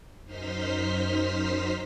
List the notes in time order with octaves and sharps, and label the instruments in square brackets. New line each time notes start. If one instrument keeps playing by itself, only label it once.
[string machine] F#2 D#4 C5 C6 F6 B6